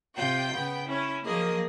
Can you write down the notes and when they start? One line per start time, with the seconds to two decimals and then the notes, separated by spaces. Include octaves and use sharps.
0.17 C3 F4 G5 G6
0.54 C#3 B3
0.89 C#4 E4
1.26 F3 F#3 A#3 G#4 A#4 D#5